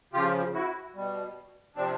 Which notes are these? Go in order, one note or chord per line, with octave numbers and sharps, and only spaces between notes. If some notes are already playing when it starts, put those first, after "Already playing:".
C#3 F3 F4 G4
E4 F#4
B2 G3
C3 F3 C4 D4